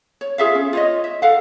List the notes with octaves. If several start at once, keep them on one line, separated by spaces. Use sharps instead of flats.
C#5
F4 G#4 E5 F5
C#4
F4 C#5 D#5
E5
A4 F5 F#5